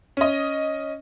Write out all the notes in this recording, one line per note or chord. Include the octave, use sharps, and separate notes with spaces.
C#4 D#5